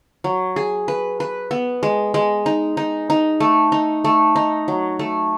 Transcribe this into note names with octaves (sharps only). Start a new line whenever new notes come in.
F#3
G#4
B4
B4
B3
G#3
G#3
D#4
D#4
D#4
A3
D#4
A3
D#4
F#3
A3